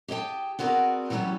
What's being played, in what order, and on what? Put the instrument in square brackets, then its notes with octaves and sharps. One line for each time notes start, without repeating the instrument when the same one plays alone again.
[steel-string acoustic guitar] G4 G#4 D#5 G5 A5
B3 C4 F#4 G#4 A#4 D5
E3 F#3 G3 A3 B3 C#4